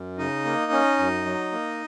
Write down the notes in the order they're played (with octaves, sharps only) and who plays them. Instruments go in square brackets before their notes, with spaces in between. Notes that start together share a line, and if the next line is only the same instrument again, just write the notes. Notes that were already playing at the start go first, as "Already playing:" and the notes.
Already playing: [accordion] F#2
C#3 D#4 D#5
A#3
C#4
F#2
F#3
A#3